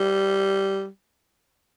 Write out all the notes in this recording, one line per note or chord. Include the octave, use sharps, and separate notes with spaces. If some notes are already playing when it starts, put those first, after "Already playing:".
Already playing: G3